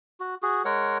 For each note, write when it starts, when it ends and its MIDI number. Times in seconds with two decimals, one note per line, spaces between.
0.20 0.35 66
0.43 0.63 66
0.43 0.63 68
0.65 0.98 56
0.65 0.98 70
0.65 0.98 73
0.65 0.98 78